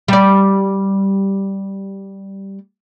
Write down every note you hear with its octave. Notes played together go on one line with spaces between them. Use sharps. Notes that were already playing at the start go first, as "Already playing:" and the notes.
G3 D5